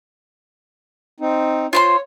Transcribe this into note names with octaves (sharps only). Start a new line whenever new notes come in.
C4 D#4
F4 C5 C#5 C6